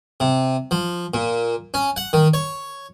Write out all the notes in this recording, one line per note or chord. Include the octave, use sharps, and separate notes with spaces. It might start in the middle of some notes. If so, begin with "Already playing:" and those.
C3
F3
A#2
C#4
F#5
D#3
C#5